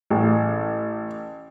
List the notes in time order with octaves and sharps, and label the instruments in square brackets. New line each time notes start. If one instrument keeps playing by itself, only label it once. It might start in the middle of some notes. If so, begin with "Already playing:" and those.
[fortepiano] A1